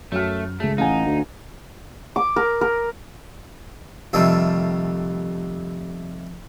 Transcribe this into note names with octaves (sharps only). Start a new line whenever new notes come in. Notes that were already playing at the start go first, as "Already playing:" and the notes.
F#2 A3 F6
C#2 A3 G#4
A1 D#4 F5 F#5 G#5
D2
D6
A#4
A#4
F2 C3 D#3 G3 A3